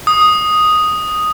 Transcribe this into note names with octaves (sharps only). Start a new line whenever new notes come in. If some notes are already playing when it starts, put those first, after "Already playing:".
D#6